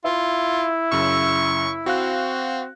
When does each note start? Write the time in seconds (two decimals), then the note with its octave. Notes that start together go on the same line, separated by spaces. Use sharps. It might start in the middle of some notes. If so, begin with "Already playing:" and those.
0.05 E4 F4
0.92 F#2 C#3 C#6 E6
1.86 C4 F#4 F5 F#6